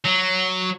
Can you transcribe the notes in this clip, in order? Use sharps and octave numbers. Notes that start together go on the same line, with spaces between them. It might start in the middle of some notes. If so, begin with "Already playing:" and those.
F#3